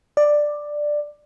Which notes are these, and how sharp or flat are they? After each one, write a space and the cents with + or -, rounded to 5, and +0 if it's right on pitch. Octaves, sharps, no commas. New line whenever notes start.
D5 +10